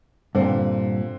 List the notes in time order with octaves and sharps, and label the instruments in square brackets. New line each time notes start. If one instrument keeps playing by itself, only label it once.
[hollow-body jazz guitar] G2 A#2 [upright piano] D3 C4